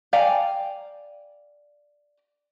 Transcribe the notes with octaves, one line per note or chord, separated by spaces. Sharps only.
D5 F5 G5 G#5 A#5